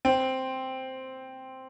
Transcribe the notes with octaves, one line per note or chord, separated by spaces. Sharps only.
C4